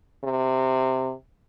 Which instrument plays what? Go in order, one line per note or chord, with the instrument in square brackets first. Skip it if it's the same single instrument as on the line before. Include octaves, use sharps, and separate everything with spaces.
[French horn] C3